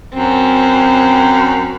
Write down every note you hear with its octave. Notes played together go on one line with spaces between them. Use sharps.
F#2 C4